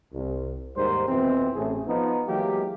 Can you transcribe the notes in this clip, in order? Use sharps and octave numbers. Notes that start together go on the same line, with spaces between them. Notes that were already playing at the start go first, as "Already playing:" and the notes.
C2
D#2 G#2 G3 A#4 C5
F2 B2 E3 C4
A1 A2 A3 G#4
F3 B3 D#4
E3 F#3 G#3 A#3 G4